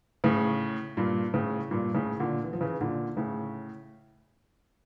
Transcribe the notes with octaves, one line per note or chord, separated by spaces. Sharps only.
A2 C#3
G2 A#2
A2 C#3
G2 A#2
A2 C#3
A#2 D3
E3
F3
C#3 E3
A#2 D3
A2 C#3